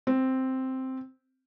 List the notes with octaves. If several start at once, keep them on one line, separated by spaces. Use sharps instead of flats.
C4